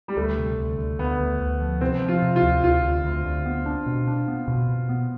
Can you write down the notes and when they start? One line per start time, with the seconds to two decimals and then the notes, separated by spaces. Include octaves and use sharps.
0.08 G3
0.17 D2 A3
0.37 C3
0.58 D2
0.78 D2
0.99 D2 B3
1.20 D2
1.40 D2
1.61 F3
1.81 C3 C4
2.02 F3
2.08 F4
2.22 C3
2.36 F4
2.42 D2
2.64 D2 F4
2.83 D2
3.04 D2
3.25 D2
3.46 B3
3.66 D4
3.86 B2
4.08 D4
4.28 B3
4.48 B2
4.69 B2
4.89 B3